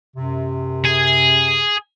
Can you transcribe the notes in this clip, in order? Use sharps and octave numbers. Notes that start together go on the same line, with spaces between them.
F#2 C3
G#4